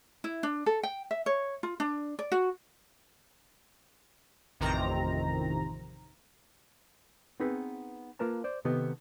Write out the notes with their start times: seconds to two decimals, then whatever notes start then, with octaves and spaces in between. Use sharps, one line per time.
0.24 E4
0.43 D4
0.66 A4
0.83 G5
1.11 E5
1.26 C#5
1.63 F4
1.80 D4
2.19 D5
2.32 F#4
4.60 A1 F2 C3 D#3 C4 A#5
7.40 B3 C4 D#4 G#4 B4
8.19 A#3 F4 A#4 B4 A5 A#5
8.44 C5 D5
8.65 C3 D#3 B3 G4 A4 D#5